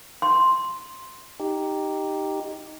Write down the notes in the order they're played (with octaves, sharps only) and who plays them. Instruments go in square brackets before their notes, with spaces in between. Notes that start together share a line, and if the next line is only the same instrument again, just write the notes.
[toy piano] C6
[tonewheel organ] D#4 G4